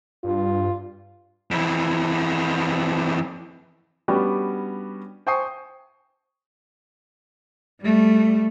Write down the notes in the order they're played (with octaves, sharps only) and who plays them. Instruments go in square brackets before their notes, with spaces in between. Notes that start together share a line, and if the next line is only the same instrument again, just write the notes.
[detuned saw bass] G2 [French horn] F4
[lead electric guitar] F2 E3
[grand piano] G3 B3 C#4 D4 F#4 G4
C5 G5 G#5 C#6 D#6 C7
[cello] G3 A3